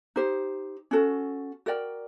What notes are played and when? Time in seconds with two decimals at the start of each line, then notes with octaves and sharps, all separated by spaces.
0.16 D#4 G4 C5
0.91 C#4 F#4 A4
1.66 F#4 A#4 D5 G5